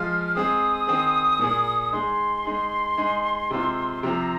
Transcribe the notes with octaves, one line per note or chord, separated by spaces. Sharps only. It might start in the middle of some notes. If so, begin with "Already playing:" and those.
Already playing: F3 G#3 F4 F6
G#3 C4 G#4 D#6
D#3 C4 G#4
A#2 A#3 G#4
G#3 D#4 G#4 C6
G#3 D#4 G#4
G#3 D#4 G#4
C3 G#3 C4 F4
C3 F3 C4 A#5